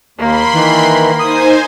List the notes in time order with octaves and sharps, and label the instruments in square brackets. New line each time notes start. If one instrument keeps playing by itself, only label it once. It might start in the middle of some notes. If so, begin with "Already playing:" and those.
[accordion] D#2 [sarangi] A#3 [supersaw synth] B5 C6
[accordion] D#3 E3
[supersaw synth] D#4 C5 G#5 [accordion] D#6